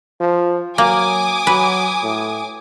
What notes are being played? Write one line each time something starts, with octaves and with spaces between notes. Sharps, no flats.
F3
F#3 A#3 G#5 D6 D#6
F#3 B4
A2